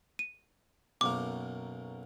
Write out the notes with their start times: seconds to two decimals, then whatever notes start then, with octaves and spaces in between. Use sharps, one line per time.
0.19 D#7
1.01 B1 F#2 A#3 D6